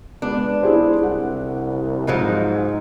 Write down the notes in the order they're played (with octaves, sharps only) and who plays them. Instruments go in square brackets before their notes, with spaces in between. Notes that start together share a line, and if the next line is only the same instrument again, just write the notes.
[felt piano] G#3 B3 [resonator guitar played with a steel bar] D4
[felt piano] E4 G#4 C5
[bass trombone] C2 [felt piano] F#5
[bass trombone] G#2 [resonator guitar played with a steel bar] F3 F#3 D#4